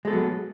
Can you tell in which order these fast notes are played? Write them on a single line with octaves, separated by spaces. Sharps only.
G#3 A4 B3 F#3